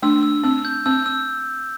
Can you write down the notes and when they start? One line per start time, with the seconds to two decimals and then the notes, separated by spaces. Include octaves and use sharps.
0.03 A3 D4 E6
0.23 E6
0.43 C4 E6
0.65 G6
0.86 C4 E6
1.06 E6